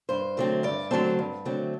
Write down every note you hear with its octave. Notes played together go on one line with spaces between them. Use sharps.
G2 C5
D3 F#3 A3 C4
G2 D5
D3 F#3 A3 C4 A5
G2
D3 F#3 A3 C4